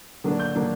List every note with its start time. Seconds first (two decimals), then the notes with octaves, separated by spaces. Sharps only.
0.24 D3 F#3 A#3 D4
0.39 G6
0.55 D3 F#3 A#3 D4